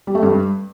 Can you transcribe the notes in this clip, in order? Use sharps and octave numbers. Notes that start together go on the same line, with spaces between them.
G3
A3
G2